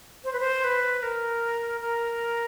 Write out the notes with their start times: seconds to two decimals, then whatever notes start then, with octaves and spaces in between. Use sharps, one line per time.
0.24 C5
0.33 B4
0.40 C5
0.64 B4
1.03 A#4
1.81 A#4